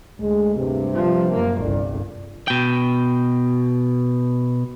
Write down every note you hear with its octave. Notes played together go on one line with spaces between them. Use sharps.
D2 G#3
G2 C3
F3
F#2 A#3
G1 C2 D5
B2 G5